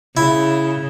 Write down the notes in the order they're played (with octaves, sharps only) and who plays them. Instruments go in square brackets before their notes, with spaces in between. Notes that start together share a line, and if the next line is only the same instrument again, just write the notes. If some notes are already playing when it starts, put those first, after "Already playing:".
[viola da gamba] C#3 [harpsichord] E4